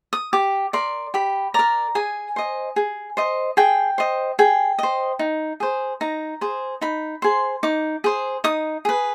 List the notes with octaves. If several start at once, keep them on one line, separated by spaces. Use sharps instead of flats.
D#6
G4 D6
A#4 D5 C6
G4 B5
A#4 D5 A#5
G#4 G#5
C5 D#5
G#4
C5 D#5
G#4 G5
C5 D#5
G#4 G5
C5 D#5
D#4
G#4 C5
D#4 A#5
G#4 C5
D#4 B5
G#4 C5 C6
D#4 D6
G#4 C5
D#4 D#6
G#4 B4